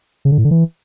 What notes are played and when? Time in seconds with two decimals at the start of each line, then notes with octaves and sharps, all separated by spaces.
0.25 C#3
0.31 D3
0.38 A2
0.44 D3
0.51 E3